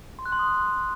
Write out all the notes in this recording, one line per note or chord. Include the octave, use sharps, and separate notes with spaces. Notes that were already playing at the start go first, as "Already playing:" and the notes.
C6
F#6
C6
D#6